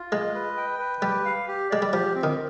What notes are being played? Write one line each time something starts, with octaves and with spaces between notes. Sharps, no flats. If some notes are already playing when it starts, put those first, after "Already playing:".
Already playing: F4
G#3 D#5
B4
G5
B4
G3 G4
F5
G4
G#3 D5
G3
F3 G4
C4
D#3